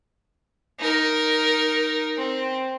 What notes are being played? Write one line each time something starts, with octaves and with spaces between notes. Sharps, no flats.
D#4 A#4
C4